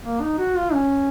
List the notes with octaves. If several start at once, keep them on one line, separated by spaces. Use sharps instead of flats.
A#3
D#4
F#4
F4
C#4